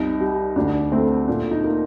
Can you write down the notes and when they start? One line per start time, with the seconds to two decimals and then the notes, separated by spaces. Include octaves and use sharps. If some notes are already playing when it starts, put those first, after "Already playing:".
Already playing: C2 D#4
0.20 G3
0.56 D2 D4
0.92 A3 C4
1.27 A#2 D4
1.51 D#4
1.63 A#3